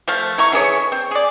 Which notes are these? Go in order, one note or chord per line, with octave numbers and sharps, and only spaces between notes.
F3 A3 F5
E4 A#5 C#6
D3 E3 G#4 C#5
C4
G#4 D5